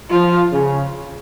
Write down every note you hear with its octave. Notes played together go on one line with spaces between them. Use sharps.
F3 F4
C#3